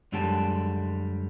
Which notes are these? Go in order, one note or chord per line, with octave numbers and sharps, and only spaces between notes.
F#2 D3 G3 G#3 G5 A5